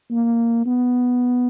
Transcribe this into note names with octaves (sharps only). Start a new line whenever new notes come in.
A#3
B3